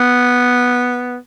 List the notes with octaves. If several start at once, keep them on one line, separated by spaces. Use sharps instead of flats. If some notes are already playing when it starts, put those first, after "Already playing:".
Already playing: B3